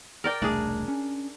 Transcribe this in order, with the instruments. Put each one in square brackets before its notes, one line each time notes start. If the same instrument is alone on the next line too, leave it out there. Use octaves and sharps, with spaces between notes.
[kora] A#4 D5 G5
[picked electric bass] E1 C2 A3 [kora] D4 G#4
[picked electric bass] C#4